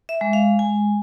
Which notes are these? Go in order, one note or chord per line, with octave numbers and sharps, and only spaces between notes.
E5
G#3
F5
G#3 G#5